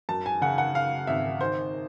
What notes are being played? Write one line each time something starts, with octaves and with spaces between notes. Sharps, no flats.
F#2 A5
G#5
C#3 F#5
F#5
C#3 F5
G#1 E5
D#3 C5